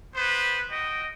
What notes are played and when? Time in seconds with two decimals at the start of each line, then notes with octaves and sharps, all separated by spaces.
0.15 B3 B4 C5
0.71 F#4 D#5 G5